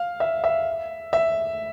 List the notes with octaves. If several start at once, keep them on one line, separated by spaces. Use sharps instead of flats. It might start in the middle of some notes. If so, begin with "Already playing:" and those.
Already playing: F5
E5
E5
E5